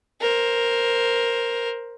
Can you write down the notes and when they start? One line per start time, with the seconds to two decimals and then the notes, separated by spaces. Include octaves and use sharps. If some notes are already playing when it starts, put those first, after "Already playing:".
0.21 A#4 C5